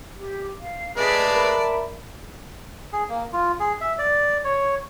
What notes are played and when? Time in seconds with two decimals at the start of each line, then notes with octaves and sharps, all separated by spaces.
0.16 G4
0.60 F5
0.97 G#3 A3 G#4 B4 D5 E5 A5
1.35 A#4 E5 B5
2.93 G#4
3.09 A#3
3.33 F4
3.60 G#4
3.81 E5
3.98 D5
4.44 C#5